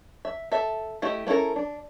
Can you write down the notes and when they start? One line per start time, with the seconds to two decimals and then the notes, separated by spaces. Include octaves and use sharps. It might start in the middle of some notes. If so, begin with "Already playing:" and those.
0.25 E5
0.52 A4 E5
1.02 A3 E4 G4 D#5
1.27 B3 C#4 E4 A4 A#4
1.56 D4